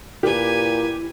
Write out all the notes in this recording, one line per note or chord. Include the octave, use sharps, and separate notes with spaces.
A#2 E4 G4 B4 G#5